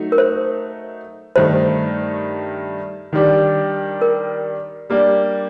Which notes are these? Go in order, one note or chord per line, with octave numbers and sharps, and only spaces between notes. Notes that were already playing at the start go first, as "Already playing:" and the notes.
Already playing: F#3 A3 D#4
A#4
C5
G2 D#3 A3 D#4 C5
D#3 G3 D4 G4
A#4
G3 A#3 D4 G4